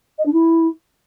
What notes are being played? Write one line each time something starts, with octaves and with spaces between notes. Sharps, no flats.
D#5
D4
E4